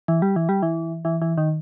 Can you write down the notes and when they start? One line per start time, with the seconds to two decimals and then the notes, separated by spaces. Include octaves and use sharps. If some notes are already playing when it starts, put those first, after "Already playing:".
0.08 E3
0.22 G3
0.36 E3
0.49 G3
0.63 E3
1.05 E3
1.22 E3
1.38 D#3